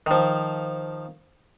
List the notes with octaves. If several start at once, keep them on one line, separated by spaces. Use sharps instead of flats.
D#3 F3